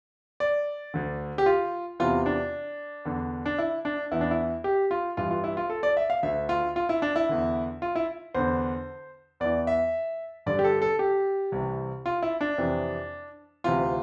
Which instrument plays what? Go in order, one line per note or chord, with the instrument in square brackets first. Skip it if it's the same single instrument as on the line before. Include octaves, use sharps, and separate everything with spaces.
[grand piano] D5
D2 D3
G4
F4
E2 C3 E3 F4
D4
E2 D3
D4
E4
D4
E2 E3 E4
D4
E4
G4
F4
G2 E3 F4
F4
E4
F4
A4
D5
E5
F5
D2 D3 E5
F4
F4
E4
D4
E4
E2 D3
F4
E4
E2 D3 C5
E2 E3 D5
E5
G2 D3 D5
G4
A4
A4
G4
C2 C3 E3
F4
E4
D4
F2 C3 E3
D2 C3 E3 F4